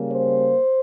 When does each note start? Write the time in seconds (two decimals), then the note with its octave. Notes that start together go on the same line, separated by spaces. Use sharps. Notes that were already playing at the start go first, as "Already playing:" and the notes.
Already playing: C#3 G3 A#3
0.12 C5